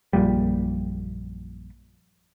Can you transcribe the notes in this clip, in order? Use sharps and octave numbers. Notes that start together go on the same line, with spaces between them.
A#1 F#2 A#2 G3